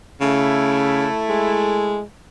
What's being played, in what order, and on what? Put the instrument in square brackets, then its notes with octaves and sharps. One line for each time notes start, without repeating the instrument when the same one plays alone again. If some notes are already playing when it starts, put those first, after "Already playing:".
[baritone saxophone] C#3 [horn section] A3 E4
[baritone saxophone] G#3